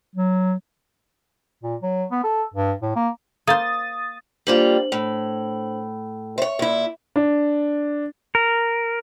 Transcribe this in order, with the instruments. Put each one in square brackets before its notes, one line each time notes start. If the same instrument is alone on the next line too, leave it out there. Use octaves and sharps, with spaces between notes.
[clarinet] F#3
[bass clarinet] A#2
F#3
B3
A4
G2
A2
A#3
[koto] A#3 C5 [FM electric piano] D#6 A6
[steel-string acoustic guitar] G3 A#3 F4 [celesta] D4 C5 F#7
[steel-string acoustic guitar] A2
[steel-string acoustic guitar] C5 C#5 [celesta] E5
[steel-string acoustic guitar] A#2 E4
[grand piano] D4
[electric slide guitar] A#4